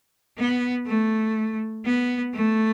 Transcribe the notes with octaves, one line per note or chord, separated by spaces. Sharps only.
B3
A3
B3
A3